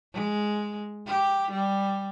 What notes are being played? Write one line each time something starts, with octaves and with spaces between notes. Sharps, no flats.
G#3
G4
G3